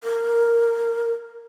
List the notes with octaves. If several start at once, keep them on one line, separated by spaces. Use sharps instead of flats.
A#4